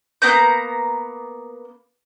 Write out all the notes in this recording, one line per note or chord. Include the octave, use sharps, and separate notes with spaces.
A#3 B3 A#5 G6